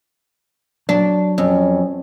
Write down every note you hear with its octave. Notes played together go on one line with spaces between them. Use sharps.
F#3 D4
F2 C#4